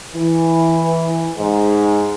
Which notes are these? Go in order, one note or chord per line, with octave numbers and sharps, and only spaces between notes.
E3
G#2